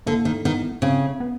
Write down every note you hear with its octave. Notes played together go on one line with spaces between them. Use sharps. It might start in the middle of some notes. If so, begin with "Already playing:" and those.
D3 A#3
D#3
D#3 B3
C#3 C4
B3